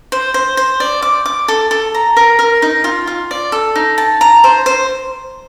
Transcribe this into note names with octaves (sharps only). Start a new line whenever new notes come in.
C5
C5
C5
D5
D6
D6
A4
A4
A#5
A#4
A#4
D#4
F4
F4
D5
A4
D#4
A5
A#5
C5
C5